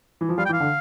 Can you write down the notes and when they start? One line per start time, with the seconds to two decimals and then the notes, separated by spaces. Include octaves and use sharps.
0.21 E3
0.29 F3
0.38 G3 F5
0.45 G5
0.49 E3
0.53 F5
0.60 D3